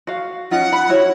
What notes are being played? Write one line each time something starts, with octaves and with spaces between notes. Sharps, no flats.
F#4 F5
C#4 D#4 F4 F#5
B5
E4 F#4 C#5